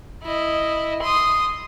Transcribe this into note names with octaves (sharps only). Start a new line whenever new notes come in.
E4 D#5
C6 D#6